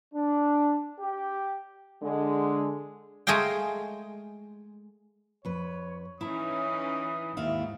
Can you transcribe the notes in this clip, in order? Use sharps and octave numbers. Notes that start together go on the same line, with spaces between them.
D4
G4
D3 G#3
G#3 A3 G#4 D#5 F5 G5
F2 B4 C#5
E3 C#4 D#4 E4 A#5 D#6
D#2 G#2 E4 F5